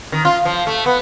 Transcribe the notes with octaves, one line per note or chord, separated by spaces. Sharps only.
D#3
F4
F3
A3
B3